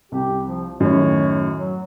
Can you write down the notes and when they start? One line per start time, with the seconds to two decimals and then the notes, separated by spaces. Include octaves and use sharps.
0.12 C2 G4
0.47 F3
0.80 F#2 A2 D#3 C#5
1.57 F#3